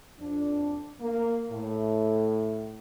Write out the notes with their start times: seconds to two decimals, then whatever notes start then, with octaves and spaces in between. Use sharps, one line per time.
0.19 F2 D4
1.00 A#3
1.51 A2